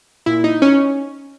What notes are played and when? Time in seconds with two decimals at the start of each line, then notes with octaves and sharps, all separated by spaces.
0.26 A#2 E4
0.44 D#4
0.62 C#4